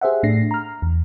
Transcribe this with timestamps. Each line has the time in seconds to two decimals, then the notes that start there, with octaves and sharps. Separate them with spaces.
0.01 G4 G#4 C5 E5 F#5
0.23 A2 A3 D4 A#6 C7
0.51 A#5 F6
0.82 E2